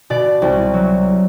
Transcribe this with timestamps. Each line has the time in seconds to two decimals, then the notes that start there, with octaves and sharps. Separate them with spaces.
0.10 B2 D5
0.42 C2
0.74 F#3